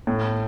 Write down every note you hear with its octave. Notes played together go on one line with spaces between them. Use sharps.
A2